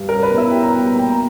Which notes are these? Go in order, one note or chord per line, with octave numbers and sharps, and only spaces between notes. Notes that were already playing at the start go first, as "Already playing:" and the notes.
Already playing: G2
C#4 A#4
B4
B2
E4 E5
G3 G5
A#5
B2 G5
A#5
A#3 G5
A#5